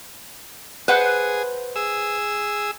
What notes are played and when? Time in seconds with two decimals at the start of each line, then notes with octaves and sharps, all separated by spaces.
0.88 G#4 B4 C5 F#5
1.76 G#4 E6